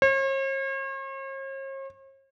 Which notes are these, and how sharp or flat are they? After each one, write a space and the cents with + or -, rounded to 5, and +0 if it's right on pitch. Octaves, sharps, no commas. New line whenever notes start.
C#5 -45